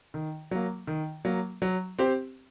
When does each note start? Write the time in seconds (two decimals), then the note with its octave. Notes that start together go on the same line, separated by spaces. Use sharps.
0.14 D#3
0.51 F#3 A#3
0.87 D#3
1.25 F#3 A#3
1.62 F#3
1.99 C4 G4 C5